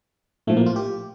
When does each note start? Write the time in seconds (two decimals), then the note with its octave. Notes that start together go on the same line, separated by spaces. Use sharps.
0.47 A#1 A2 F3 A3
0.57 A#3
0.66 F4
0.76 G4